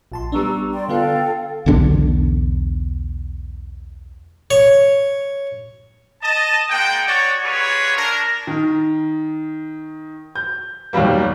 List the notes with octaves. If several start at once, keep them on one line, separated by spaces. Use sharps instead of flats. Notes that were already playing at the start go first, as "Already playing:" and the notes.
A#1 A5 C6
G3 B3 D4 A#5 C#6 E6
D5 G5 C6
D3 B3 F4 A4 F5 G5
B1 E2 D3 D4
C#5
D#5 A5
G#3 A#3 F#5 G5
F#4 C#5 D5
G3 F4 F#4 G#4 B4 C#5
D4 A#4
D#3
G6
D#2 B2 F#3 G3 A#3